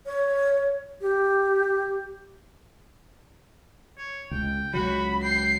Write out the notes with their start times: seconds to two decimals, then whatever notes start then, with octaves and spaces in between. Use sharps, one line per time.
0.06 C#5
1.01 G4
3.98 C#5
4.31 C#2 G5
4.74 C#2 F#3 F#4 B5
5.23 G5 C7